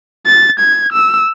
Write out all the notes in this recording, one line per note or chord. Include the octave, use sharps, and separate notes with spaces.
A6
G#6
E6